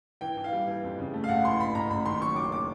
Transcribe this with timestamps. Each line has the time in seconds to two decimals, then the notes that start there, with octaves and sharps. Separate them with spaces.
0.21 E3 G5
0.37 E3
0.44 F5
0.53 G3
0.67 E3
0.83 F2
0.99 C#3
1.14 A3
1.24 F5
1.29 A1 F#5
1.44 E3 C6
1.59 A1 B5
1.75 A1 A#5
1.90 A1 B5
2.06 D#3 C6
2.21 F#3 C#6
2.36 F#1 D6
2.52 D6